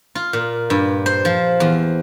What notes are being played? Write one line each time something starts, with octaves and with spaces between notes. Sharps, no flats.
F4
A#2
G2
C5
F3
E2